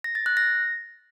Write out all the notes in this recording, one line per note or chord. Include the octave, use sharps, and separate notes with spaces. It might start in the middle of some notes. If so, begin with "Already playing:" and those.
A#6
A6
F#6
A#6